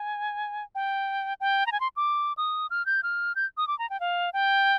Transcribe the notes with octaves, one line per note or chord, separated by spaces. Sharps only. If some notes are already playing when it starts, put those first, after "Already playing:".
Already playing: G#5
G5
G5
A#5
G#5
C6
D6
D#6
F6
G6
F6
G6
D#6
D6
A#5
G5
F5
G5